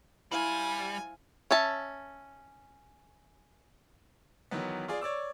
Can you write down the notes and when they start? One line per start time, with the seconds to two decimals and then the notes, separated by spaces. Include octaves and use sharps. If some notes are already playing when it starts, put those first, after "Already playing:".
0.32 G3 E4 C5 F5 G#5
1.51 C#4 E5 A5
4.51 D#3 E3 F#3 B3
4.88 F4 G#4 D5
5.01 C#5 D5 D6 E6